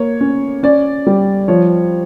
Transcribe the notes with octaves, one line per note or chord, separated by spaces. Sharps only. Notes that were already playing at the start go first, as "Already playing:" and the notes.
Already playing: A#3 C#5
C#4
C#4 D5
G3
F3 C#5